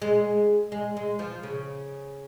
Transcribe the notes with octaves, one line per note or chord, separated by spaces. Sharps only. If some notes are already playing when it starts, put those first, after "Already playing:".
G#3
G#3
G#3
F3
C#3